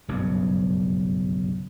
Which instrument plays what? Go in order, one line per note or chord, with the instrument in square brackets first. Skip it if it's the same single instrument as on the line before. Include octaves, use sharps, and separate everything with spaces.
[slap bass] F#1 B1 G2 C#3